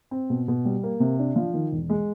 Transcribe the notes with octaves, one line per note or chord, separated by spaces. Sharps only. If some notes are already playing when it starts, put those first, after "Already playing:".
C4
B2
B2
G3
A#3
C3
D4
F3
D#3
E1
G#3